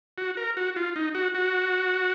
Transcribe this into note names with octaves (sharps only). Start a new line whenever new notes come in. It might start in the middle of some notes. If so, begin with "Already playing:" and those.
F#4
A#4
F#4
F4
D#4
F#4
F#4